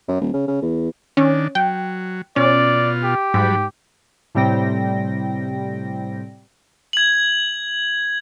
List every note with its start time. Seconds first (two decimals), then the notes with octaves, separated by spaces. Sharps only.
0.08 F#2
0.21 D#1
0.34 C#3
0.47 C#3
0.62 E2
1.17 D#3 C#4 D4
1.55 F#3 G5
2.36 B2 C#4 F4 D5
3.04 G4
3.34 G#2 F#3 G3 B5
4.35 A2 C3 G3 C4 G5 A#6
6.93 G#6 F#7